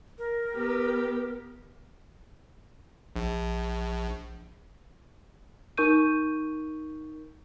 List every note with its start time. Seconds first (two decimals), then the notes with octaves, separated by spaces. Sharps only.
0.18 A#4
0.52 B3 G4
3.16 A#1
5.77 D#4 A#4 C#6 G6 D#7